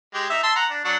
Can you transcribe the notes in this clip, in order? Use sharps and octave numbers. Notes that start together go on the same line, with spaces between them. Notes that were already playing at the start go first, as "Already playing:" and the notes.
G#3 G4
D#4 E5
A5 C6 E6
F#5 A#5
D4
F#3 D4 F#5